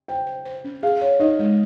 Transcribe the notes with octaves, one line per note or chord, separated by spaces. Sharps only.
C5 G5
C5
C5
C#4
G#4 F5
C#5
D#4 D#5
G#3